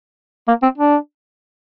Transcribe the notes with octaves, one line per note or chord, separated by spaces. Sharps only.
A#3
C4
D4